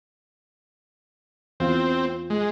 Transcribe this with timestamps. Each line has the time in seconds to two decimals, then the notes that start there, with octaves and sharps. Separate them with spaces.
1.60 E2 C4 F4
2.30 G#3